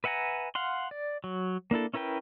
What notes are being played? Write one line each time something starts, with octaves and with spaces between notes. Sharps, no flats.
B4 E5 F#5 G#5 A#5
F5 F#5 C6
D5
F#3
A#3 D4 E4 A4
C#4 E4 A#4 B4 G5